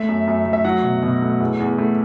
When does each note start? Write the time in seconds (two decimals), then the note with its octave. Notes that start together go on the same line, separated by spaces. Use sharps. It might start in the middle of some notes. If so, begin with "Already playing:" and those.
Already playing: A3 E5
0.08 F#2
0.27 F#2
0.46 A3
0.53 E5
0.64 F#3 F#5
0.84 B2
1.03 B2
1.22 A3
1.40 E2
1.60 E2
1.78 A3